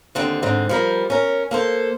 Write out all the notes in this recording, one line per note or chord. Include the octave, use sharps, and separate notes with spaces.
D#2 D3 C4
G#2 D3 C4
F3 G3 A#4
C#4 A#4
A#3 A4 C5